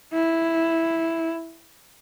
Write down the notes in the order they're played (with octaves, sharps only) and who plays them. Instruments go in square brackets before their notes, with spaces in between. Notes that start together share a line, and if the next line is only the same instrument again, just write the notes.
[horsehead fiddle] E4